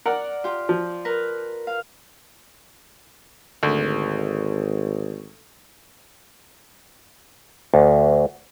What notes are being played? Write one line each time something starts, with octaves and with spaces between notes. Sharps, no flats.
A#4 D5 F#5
F4 G4
F3
A#4 B4
F5
G#1 D2
D2